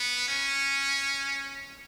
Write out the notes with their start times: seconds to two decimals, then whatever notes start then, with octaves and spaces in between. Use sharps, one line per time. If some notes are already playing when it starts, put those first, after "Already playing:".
Already playing: B3
0.28 C#4